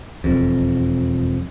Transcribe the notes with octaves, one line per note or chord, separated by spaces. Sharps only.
E1 F2